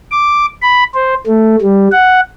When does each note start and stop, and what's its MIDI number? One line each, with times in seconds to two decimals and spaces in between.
0.11 0.45 86
0.62 0.84 83
0.94 1.14 72
1.26 1.55 57
1.62 1.88 55
1.92 2.20 78